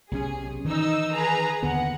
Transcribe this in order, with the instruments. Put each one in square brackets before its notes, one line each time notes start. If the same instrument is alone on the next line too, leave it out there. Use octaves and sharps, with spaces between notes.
[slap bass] B1 C3 C#4 [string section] G#4
[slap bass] D#3 E3 [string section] D#4 E6
[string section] G#4 B4 A#5
[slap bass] D#2 D3 B3 [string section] F#5